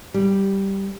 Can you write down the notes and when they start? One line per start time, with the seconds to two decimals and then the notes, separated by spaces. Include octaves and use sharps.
0.14 G3